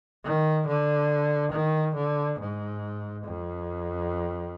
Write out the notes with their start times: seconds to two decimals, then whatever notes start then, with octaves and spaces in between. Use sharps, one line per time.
0.24 D#3
0.67 D3
1.52 D#3
1.95 D3
2.39 G#2
3.25 F2